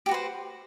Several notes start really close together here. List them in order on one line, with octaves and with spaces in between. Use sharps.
G4 F#4 B4 C5